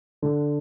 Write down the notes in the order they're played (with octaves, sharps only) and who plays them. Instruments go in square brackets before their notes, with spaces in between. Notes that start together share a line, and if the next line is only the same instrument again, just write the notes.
[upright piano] D3